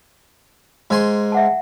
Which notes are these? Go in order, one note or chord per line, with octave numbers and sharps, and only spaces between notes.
G#2 G#5 C6
E5 F#5 A5